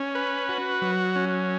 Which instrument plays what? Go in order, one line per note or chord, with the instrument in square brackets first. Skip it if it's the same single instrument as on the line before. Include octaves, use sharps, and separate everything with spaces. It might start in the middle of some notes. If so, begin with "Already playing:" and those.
Already playing: [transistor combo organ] C#4
B4
F#4
F#3
C#4